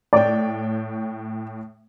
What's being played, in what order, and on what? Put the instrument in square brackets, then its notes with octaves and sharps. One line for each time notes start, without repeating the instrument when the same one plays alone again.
[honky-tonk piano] A2 C#5 G5 [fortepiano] D5